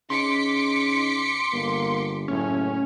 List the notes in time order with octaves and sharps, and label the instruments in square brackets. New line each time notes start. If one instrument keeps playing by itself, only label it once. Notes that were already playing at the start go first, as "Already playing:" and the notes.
[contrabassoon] C#3 [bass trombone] D#4 [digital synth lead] C6 [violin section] D6 B6 C#7
[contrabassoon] G1 [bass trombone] A#3
[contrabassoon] F#1 [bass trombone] A2 [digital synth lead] C#4